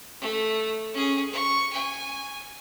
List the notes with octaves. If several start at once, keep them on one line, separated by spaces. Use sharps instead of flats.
A3
C#4 G#4
C#6
G#5